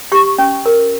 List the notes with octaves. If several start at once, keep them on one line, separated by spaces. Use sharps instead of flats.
G4 C#6
C#4
A#4